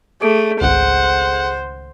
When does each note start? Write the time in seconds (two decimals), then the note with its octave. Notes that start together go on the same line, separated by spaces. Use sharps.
0.21 A3 G#4 A4 D7
0.61 G#1 C#2 C5 F#5